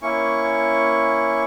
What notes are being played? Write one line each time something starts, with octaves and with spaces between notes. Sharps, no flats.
A#3 C#4 E4 C#6